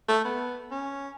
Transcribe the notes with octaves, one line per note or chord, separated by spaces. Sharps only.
A3
B3
C#4